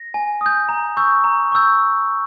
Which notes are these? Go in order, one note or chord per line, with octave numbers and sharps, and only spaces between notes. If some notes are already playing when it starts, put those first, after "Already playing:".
Already playing: A#6
G#5
D#6 G6
A#5
C#6 E6 G6
A#5
C#6 E6 G6